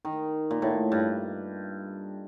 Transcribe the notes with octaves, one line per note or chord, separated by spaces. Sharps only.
D#3
A#2
A2
G2